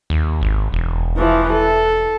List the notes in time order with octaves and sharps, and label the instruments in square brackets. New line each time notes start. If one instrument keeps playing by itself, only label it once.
[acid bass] D#2
G#1
E1
[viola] E3 F3
A4